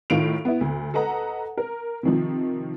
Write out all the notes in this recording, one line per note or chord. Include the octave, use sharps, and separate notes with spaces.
A2 D#3 F4 F5 D7 F7
B3 E4
D2
A4 B4 D#5 F#5 A#5
A#4
C3 D#3 F3